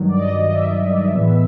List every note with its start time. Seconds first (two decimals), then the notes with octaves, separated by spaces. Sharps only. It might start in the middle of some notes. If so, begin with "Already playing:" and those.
Already playing: G2 D#3 F#3
0.08 D5
0.18 D#5
0.40 D#5
0.50 E5
1.13 A2 E3 G#3 B3